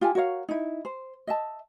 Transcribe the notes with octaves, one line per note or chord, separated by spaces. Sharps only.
F4 G4 A4 G#5
F#4 A#4 C#5 F5
D#4 E4
C5
D#5 E5 A5